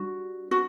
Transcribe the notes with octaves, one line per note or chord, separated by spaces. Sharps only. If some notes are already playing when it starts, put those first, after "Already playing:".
Already playing: G3 D4 F#4
F#4